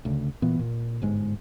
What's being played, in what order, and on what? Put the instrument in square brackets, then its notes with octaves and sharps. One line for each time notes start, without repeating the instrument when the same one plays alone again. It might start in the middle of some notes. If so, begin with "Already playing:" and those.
[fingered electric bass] D2 C#3
A#2 E3 B3
A#2
G1 G#2 G#3